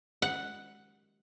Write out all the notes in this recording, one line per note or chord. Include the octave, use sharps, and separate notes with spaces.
F#5